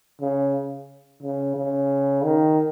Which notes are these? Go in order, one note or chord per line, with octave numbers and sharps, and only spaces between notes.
C#3
C#3
C#3
D#3